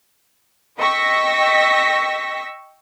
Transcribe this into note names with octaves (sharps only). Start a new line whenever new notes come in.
D#5 G5 C#6 E6 A#6 B6